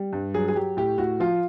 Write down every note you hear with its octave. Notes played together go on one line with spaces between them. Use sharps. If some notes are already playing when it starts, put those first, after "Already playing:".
Already playing: G3
G2
F#3 G#4
G#4
F#3 G4
A2 G4
A2 F#4
F3 F4